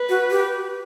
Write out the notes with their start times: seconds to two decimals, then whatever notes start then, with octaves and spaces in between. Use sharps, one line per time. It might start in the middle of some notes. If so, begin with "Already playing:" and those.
Already playing: B4
0.09 F#4
0.31 G4